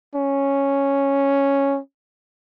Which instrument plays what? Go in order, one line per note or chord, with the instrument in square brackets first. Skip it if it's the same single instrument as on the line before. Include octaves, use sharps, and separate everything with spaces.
[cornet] C#4